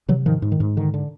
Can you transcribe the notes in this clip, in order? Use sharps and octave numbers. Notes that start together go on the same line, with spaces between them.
C3 E3 F#3
G#2 D#3 F3
G#2
D#3
G#2
D3 D#3
D3